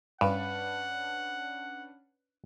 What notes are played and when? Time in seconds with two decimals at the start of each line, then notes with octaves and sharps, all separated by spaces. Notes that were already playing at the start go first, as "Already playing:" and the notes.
0.21 G2 C#4 D4 B4 F#5